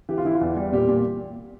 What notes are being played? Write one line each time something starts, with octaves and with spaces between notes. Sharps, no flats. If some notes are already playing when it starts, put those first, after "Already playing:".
E3 G4
F4
E3 E4
F4
E2
G3
A#2 G4
A#2